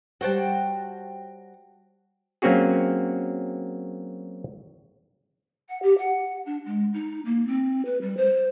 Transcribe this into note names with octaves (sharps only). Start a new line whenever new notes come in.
G3 F#4 C5 C#5 G5 A5
F#3 A#3 C4 C#4 F#4 G#4
F#5
G4
F#5
D4
G#3
D#4
A#3
C4
B4
G3
C5